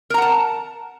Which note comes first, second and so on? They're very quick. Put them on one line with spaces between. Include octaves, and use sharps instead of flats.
A#4 A#5 F#5 A5